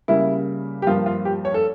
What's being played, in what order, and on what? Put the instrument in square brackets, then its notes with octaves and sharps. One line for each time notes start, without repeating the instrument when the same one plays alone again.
[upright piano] C#3 G3 A#3 E4
G4
G2 F3 A#3 F4
F4
G4
C#5
A4